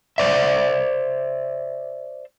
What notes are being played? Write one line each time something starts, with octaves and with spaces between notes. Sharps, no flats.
C5 D5 E5